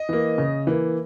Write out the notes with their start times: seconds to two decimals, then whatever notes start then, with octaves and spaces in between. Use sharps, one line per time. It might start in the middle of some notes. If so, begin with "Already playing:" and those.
Already playing: D#5
0.09 E3 A#3
0.38 C#3
0.67 E3 A#3